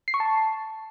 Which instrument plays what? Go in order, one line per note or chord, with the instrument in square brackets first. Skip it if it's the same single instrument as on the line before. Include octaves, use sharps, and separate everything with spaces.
[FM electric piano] C7
C#6
A5